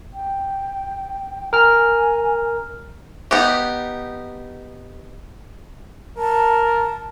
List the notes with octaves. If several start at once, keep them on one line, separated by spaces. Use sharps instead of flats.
G5
A#4 G#5 F6
B3 D#4 G4
A#4 A5